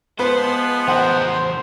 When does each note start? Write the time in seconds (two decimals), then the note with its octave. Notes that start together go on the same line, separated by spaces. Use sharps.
0.19 F3 G#3 B3 B4 C5
0.88 E2 A#4 C5 F#5